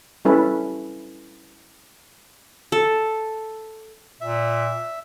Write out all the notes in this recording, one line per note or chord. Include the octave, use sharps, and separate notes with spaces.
G3 C#4 E4 A4 B4
A4
A#2 E5